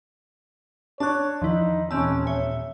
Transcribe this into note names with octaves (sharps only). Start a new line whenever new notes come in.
D4 C#5 A5 F#6
E2 D#3 F3 D#4 E4
D#1 E3 C4 C#4 A5 E6
C#5 E5